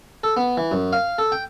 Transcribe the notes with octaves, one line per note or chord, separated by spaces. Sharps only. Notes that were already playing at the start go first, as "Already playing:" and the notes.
A4
B3
E3
F#2
F5
A4
G5